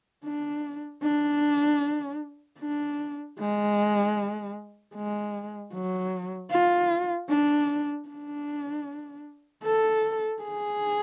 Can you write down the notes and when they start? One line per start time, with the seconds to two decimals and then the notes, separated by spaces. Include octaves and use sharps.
0.25 D4
1.03 D4
2.59 D4
3.39 G#3
4.95 G#3
5.74 F#3
6.51 F4
7.29 D4
8.09 D4
9.64 A4
10.43 G#4